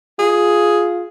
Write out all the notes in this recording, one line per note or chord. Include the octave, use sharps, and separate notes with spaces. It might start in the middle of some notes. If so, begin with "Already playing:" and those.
F4 G#4